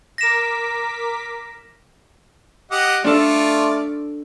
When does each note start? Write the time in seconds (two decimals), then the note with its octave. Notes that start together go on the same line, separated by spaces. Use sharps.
0.18 A#4 D6 A#6 B6 E7
2.71 G4 D#5 F#5
3.04 A3 D4 F4 A4 D5